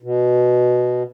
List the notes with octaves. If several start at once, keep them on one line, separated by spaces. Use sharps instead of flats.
B2